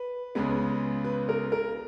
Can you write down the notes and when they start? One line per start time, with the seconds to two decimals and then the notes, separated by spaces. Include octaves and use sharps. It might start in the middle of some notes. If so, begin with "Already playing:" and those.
Already playing: B4
0.35 C#2 C#3 G#3 B3
1.04 B4
1.29 A#4
1.52 A#4